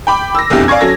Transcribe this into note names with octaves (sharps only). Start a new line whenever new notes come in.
G5 B5 D6
E6 A#6
F1 B1 E2 D4 E4 G4
D5 F5 G#5 C#6 G#6
F#3 C#4 A4 A#6